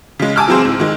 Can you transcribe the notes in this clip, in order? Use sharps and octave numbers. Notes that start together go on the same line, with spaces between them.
C#3 G#3
G#5 A5 D6 E6 F6
E3 F#3 C4 G#4 C5
G#2
D#3 G#3